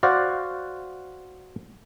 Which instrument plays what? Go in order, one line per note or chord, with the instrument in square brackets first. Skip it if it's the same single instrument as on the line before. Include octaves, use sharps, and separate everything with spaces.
[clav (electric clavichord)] F#4 C5 D5 F5 F#5